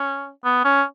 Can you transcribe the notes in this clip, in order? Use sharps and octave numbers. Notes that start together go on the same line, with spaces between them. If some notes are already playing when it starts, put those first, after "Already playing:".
Already playing: C#4
B3
C#4